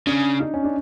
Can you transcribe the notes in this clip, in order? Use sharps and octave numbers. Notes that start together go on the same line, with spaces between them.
C#3 D4
D#4
C#4
D4